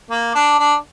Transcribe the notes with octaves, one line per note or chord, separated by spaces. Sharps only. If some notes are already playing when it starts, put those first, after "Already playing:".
A#3
D4
D4